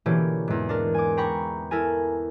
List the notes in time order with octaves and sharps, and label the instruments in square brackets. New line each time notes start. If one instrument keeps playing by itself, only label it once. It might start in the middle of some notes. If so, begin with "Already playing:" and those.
[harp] B2 D3 E3 A#3 C#4 G4
E2 G#2
D4 A#4
G#5 D6
G5 A#5 B5 C#6
E4 A4 A#4 G#5